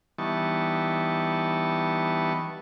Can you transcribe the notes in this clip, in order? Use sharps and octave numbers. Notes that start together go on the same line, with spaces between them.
E3 G3 B3 D#4 A5 C#6